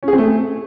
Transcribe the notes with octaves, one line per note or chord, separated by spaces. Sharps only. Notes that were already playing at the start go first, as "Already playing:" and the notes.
C#4
G#4
C4
A3